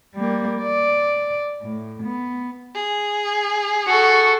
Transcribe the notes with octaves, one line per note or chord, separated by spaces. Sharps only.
G3 A#3
D5
A2
B3
G#4
F#4 A4 C#6